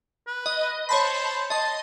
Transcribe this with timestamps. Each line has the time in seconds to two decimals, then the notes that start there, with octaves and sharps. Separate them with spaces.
0.27 B4
0.46 D#5
0.89 C5 C#5 A5 B5
1.50 D#5 A5 C6